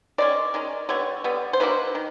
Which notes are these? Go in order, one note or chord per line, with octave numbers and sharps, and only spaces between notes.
D#3 G#3 C#4 D5
D#3 G#3 C#4
D3 G3 B3 C#5
D3 G3 B3
C5
D#3 F#3 A#3 D4 B4
D#3